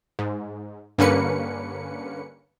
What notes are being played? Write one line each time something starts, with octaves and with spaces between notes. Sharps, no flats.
G#2
G2 D3 A#3 C#4 B4 C#7